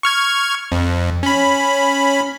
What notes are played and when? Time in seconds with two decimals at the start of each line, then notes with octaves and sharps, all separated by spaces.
0.03 C#6 F6 G#6
0.72 F2
1.23 C#4 B5